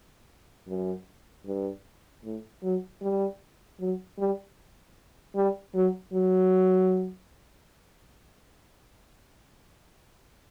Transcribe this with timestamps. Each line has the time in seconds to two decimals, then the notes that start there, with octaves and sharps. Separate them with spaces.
0.68 F#2
1.45 G2
2.23 A2
2.63 F#3
3.01 G3
3.79 F#3
4.18 G3
5.35 G3
5.74 F#3
6.13 F#3